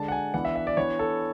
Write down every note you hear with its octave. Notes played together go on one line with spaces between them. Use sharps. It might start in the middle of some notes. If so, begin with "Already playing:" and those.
Already playing: D3 G#3 D4 A5
F#5
G#5
E3 B3 D4 F#5
E5
E5
D5
E3 B3 D4 C#5
A4